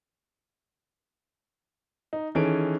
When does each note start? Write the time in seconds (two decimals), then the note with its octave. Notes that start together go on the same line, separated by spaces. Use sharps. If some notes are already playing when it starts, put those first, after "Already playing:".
2.13 D#4
2.35 D#3 E3 C#4 G#4 A4 D7